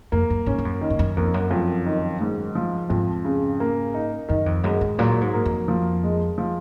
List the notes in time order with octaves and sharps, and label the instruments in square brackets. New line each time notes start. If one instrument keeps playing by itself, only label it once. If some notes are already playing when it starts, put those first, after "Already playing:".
[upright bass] F2 [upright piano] A#3
[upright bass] F#2
[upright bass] G#2 [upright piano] C#4
[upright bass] G#2
F#2
[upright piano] D#3
[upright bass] G#2
F#2
[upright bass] F2 [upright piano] A#3
[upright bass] F#2
[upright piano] F2
D#3
G#2
F3
[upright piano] F2 [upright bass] G#2
[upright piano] C#3
A#3
D#4
[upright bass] F#2 [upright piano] D#3
[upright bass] F2
[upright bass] F#2 [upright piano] G#3
[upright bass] G#2
[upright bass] A#2 [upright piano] F#3
[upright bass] G#2
[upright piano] A#3
[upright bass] F2
[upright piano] F3
G#3
F3